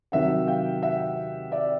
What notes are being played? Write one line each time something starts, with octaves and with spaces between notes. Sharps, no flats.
C3 D#3 F#3 E5 F#5
F5 G5
E5 F#5
D5 E5